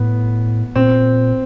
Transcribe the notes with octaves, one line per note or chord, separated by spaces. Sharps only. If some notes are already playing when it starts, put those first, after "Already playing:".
Already playing: A2 B3
A#2 C4